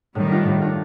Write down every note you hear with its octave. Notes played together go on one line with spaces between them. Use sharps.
A2 D#3 G3
A3 D4 F4
A2
A3 D4 F4